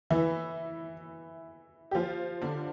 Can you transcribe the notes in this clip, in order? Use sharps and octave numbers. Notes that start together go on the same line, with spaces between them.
E3 E4
G4
F3 F4
D3 D4